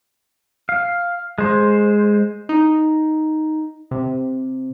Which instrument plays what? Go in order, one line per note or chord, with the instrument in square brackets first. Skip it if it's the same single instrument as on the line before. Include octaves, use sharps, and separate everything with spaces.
[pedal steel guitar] F5
G#3 C5
[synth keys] D#4
C3